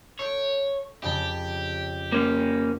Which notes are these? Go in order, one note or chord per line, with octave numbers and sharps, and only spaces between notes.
A4 C#5 G6 D7
F2 C#3 G4 A5
A#3 C#4